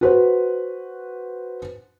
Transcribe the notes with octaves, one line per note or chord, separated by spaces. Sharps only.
F#4 B4 C5